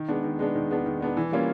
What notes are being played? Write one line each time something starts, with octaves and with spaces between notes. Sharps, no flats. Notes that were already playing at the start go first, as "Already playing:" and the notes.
Already playing: D#3
G#3 B3 D4
D#3
G#3 B3 D4
D#3
G#3 B3 D4
D#3
G#3 B3 D4
E3
G3 A#3 C#4 F4